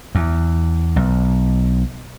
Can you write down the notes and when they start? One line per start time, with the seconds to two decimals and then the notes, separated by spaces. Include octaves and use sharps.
0.15 E2
0.96 B1